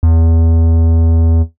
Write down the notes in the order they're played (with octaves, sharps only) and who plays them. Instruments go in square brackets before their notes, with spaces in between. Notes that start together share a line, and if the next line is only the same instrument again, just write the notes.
[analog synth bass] E2